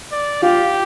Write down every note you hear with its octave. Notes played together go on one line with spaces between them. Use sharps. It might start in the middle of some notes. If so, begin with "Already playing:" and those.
D5
F4 G4